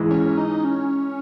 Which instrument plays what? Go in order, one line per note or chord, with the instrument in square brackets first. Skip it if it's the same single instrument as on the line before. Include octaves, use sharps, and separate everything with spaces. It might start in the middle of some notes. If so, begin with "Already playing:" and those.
Already playing: [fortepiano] G#2 E3 G#3
[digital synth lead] C#4
D#4
C#4